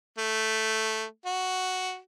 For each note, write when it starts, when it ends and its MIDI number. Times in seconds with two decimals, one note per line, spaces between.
0.18 1.04 57
1.26 1.98 66